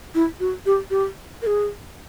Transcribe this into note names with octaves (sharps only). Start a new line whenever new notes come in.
E4
F#4
G4
G4
A#4
G#4